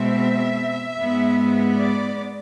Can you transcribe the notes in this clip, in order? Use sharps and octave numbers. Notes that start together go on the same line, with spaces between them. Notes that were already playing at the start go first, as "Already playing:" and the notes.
Already playing: B2 G#3 C4 E5
G#2 G#3 B3
D5